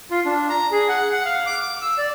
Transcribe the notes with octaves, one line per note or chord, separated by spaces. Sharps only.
F4
D4
A#5
G#4
F#5
F#5
F5
D6
D6
E6
D5